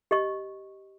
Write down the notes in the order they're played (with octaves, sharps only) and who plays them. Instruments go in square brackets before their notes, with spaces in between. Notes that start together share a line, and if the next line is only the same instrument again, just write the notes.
[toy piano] G4 D#5 C#6